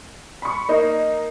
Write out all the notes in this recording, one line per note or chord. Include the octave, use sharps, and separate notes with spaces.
B5 C#6
A#3 D#4